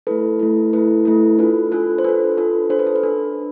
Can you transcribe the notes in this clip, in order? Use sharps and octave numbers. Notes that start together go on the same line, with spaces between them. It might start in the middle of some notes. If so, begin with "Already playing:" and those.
A3 E4 A4 B4
A3 E4 A4
A3 E4 A4 B4
A3 E4 A4
D4 F4 A4 B4
D4 F4 A4
C5
D4 F4 A4 B4
D4 F4 A4
D4 A4 C5
B4
A4
B4
D4